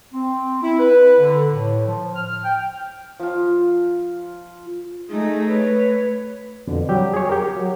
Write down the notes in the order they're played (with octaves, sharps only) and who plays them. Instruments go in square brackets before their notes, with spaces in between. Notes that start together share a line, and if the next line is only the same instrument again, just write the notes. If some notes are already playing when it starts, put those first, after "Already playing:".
[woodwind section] C4
E4
B4
D3
A2
F3
F6
G5
[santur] F3 F4
[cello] A3 [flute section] D#4 G#4 D#6
[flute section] B4 C#5
[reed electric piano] F2 B2 D3
F#3 G3 G4
G#4 C#5
G4 A#4
F#3